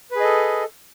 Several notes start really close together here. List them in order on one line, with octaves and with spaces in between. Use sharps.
B4 G#4 D#5 A4